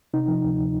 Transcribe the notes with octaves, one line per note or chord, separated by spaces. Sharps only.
C3 D#4
F3
D2